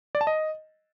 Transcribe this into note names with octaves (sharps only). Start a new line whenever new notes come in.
D5
A5
D#5